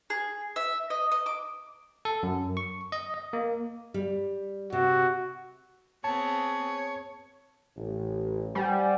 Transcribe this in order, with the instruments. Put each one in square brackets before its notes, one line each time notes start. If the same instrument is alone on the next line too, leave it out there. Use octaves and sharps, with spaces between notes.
[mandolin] G#4
E5
D#5
D#5
D6
[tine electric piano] A4
F#2
C#6
D#5
D#5
A#3
[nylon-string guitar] G3
[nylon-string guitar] C3 [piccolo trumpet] F#4
[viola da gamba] B3 C4 G#4 [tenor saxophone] C#5 [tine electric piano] A5
[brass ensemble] A1
[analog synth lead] G3 [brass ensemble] C5 F#5 G#5